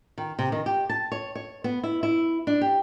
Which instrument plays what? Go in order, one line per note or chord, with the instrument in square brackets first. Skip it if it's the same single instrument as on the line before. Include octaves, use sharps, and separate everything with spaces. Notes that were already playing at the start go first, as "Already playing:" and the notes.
[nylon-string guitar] D#3
C3
D#3
G4
A5
C#5
C#5
B3
E4
E4
D4
G4